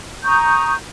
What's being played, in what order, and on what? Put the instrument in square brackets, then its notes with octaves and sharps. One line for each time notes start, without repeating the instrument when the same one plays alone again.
[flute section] A#5 C#6 D#6 G6